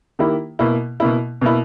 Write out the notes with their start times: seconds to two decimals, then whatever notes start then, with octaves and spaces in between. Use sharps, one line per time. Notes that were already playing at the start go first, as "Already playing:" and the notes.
0.19 D#3 A#3 E4 G4
0.59 B2 A#3 E4
1.00 B2 A#3 E4
1.41 B2 A#3 E4